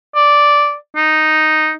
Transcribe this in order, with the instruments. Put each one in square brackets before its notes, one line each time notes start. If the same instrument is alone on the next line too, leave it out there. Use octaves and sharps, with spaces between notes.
[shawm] D5
D#4